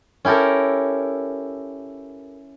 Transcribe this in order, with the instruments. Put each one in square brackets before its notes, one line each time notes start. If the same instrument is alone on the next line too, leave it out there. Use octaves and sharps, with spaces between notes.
[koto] C#4 E4 G4 A4 A#4